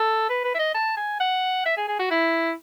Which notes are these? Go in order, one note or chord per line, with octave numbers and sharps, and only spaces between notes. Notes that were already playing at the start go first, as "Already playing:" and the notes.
Already playing: A4
B4
B4
E5
D#5
A5
G#5
F#5
E5
G#4
G#4
F#4
E4